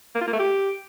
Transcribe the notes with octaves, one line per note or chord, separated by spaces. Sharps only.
A#3
F4
A#3
A3
G4